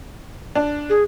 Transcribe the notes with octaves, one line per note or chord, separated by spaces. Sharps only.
D4
G#4